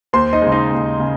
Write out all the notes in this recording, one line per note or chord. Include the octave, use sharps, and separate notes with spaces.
D#2 C5 C6
D#4 D#5
C#3 G#3
D#4 D#5
D#2
C#3